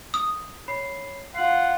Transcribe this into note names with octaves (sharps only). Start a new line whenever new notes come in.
D#6
C#5 B5 C7
F4 F#5 C7 F#7